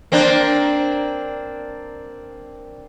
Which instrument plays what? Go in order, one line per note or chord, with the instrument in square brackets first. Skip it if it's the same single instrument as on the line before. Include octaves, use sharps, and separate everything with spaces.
[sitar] A#3 C4 D4